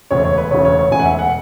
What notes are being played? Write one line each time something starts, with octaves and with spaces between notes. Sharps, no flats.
E1 D2 C#3 C#5
C#5
B4
E1 D2 C#3 C#5
C#5
C#5
E1 D2 C#3 G#5
F#5
E5
F#5